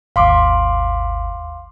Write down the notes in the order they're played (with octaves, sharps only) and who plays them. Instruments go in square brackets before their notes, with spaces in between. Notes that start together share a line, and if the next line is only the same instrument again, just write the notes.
[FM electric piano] G#1 D#2 [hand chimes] F5 C6 D6